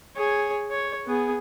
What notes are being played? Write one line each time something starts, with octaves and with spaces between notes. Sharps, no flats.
G#4 C#5
C#5
B3 G#4